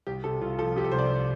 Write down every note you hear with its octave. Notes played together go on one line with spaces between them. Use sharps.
C2 G4
C3 A4
C2 F4
F3 A4
C3 G4
A4
C2 C5
D5
C2